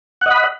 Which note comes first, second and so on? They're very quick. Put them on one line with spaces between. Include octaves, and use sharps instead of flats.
F#5 D#5 B5